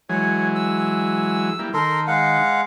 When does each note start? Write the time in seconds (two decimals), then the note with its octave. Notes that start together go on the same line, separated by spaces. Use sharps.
0.09 E3 F#3 G#3 C#5
0.55 E6
1.59 G3 A#3 E4
1.74 D#3 A4 A#4 C6
2.08 G#3 F5 F#5